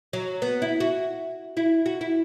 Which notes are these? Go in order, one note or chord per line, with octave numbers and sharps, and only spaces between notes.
F#3
B3
E4
F#4
E4
F#4
E4